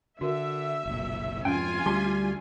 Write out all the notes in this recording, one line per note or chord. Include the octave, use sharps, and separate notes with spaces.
D3 F#4 A#4 E5
F#1 B1 A#2
F2 G#2 C3 C#4 F4 G5 G#5
D2 G3 A5 C6